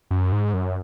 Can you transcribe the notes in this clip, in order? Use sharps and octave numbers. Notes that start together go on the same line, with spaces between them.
F#2
G#2
F#2